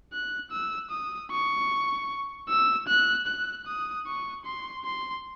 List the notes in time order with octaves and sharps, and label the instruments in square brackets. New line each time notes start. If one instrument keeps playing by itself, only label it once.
[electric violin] F#6
E6
D#6
C#6
E6
F#6
F#6
D#6
C#6
C6
C6